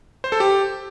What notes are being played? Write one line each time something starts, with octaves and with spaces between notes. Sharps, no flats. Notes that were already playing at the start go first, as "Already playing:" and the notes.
C5
A4
G4